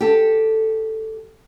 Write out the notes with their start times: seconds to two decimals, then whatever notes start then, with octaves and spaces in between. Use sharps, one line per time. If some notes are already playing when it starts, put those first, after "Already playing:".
0.01 G4 A4